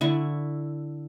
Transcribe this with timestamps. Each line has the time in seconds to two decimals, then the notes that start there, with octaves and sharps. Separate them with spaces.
0.01 D3 E4 C#6